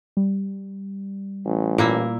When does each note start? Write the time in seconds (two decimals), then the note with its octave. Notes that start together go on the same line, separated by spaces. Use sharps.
0.17 G3
1.45 A1
1.78 A#2 A#3 E4